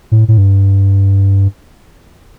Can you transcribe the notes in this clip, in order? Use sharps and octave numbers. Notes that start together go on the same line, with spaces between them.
A2
A2
G2